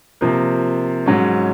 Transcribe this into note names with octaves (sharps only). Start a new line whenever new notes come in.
C3 F3 A#3
G#2 F#3 C#4